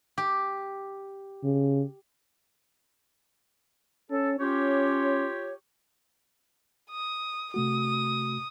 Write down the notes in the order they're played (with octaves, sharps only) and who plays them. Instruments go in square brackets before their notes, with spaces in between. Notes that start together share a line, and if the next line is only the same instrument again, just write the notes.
[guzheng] G4
[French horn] C#3
[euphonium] C#4 [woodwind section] A4
[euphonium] C#4 [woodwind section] F4 G4 C#5
[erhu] D#6
[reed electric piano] C3 A3 F#4 [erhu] D#6